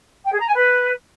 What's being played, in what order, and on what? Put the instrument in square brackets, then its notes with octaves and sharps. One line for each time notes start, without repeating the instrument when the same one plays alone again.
[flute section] G5
G#4
A#5
G#5
B4